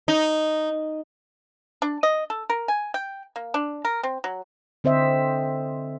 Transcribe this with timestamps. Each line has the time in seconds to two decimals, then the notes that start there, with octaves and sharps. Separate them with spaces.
0.08 D#4
1.82 D4
2.03 D#5
2.30 A4
2.50 A#4
2.68 G#5
2.94 G5
3.36 A#3
3.54 D4
3.85 A#4
4.03 C4
4.24 F#3
4.84 D3 C4 C5 D#5 E5